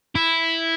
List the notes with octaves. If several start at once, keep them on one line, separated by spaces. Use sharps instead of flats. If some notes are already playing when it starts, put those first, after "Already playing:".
E4